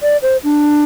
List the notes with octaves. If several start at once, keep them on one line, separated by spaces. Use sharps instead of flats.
D5
C5
D4